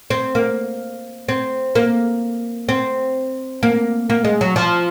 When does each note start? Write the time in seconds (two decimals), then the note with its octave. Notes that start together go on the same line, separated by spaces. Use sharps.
0.10 C4
0.35 A#3
1.29 C4
1.75 A#3
2.69 C4
3.63 A#3
4.10 A#3
4.25 G#3
4.41 F#3
4.56 F3